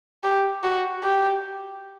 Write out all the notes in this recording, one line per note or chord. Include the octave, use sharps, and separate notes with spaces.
G4
F#4
G4